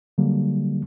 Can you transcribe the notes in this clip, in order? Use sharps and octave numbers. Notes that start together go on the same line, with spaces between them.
D3 F#3 G3 A#3